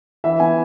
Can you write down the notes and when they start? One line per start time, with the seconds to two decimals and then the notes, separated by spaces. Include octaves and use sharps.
0.24 E3 E5
0.40 B3 G#5